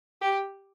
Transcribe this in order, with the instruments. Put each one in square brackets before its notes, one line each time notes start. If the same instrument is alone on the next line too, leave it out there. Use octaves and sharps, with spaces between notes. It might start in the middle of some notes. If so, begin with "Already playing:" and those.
[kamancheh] G4